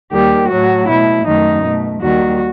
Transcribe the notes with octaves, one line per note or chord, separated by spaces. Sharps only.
D#2 D#3 G3 G4
A2 F#3 A3 F#4
B2 A3 E4
F#2 D#3 A3 D#4
B2 A3
D#2 D#3 G3 F#4